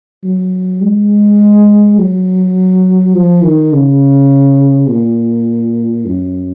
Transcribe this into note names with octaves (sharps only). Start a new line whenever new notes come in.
F#3
G#3
F#3
F3
D#3
C#3
A#2
F#2